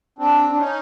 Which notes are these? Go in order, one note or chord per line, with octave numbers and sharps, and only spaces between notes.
C4 D4
D4
C#4 D#4